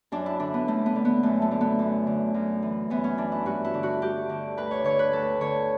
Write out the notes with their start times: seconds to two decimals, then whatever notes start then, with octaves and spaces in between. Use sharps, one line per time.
0.12 F#2 D4
0.26 E4
0.40 D3 D4
0.54 B3
0.67 F#2 A3
0.86 B3
0.95 D3
1.05 B3
1.23 F#2 A3
1.42 A3
1.51 D3
1.61 B3
1.79 F#2
2.07 D3
2.34 F#2
2.63 E3
2.90 F#2 B3
3.04 C#4
3.18 E3 D4
3.32 E4
3.46 G2 F#4
3.65 E4
3.74 D3
3.83 F#4
4.02 G2 G4
4.29 D3
4.57 D2 B4
4.71 C#5
4.84 D3 C#5
4.99 B4
5.13 D2 A4
5.41 D3 C#5